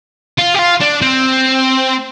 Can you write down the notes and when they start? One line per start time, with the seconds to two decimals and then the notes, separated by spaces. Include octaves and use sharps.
0.38 F4
0.54 G4
0.59 F4
0.80 D4
1.02 C4